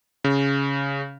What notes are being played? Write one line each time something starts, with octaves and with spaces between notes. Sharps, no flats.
C#3